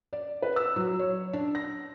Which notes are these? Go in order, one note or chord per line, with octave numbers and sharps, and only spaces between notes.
D5
B4
E6
F#3
C#5
D4
A#6